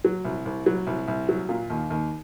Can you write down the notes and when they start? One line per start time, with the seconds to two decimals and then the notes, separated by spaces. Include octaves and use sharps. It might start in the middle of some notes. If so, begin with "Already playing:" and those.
0.05 F#3
0.25 C2
0.45 C2
0.66 F#3
0.87 C2
1.08 C2
1.29 F#3
1.49 A#2
1.70 D#2
1.90 D#2